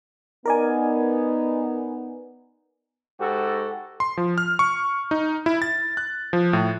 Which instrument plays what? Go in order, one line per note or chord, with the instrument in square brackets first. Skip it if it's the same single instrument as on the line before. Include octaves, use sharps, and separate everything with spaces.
[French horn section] B3 D#4 [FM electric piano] A#4 D5 G#5
[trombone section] G#2 F#4 G4 A4
[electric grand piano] C6
F3
F6
C#6
D#4
E4
A6
F#6
F3
A2